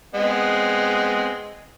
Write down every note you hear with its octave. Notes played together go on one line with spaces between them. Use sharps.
G#3 B3 C4